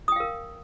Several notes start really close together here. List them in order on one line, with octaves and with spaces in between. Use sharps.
D#6 G5 F5 A#4